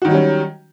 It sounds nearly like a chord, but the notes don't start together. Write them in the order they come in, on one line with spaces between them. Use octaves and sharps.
F#4 D#3 F#3 G3 C#4